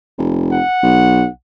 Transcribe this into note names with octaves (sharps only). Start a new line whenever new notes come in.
F1
F#5
B1